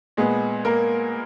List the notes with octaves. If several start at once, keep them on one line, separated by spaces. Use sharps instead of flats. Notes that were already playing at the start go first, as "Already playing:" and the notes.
A#2 G#3 B3 G#4
A#3 A#4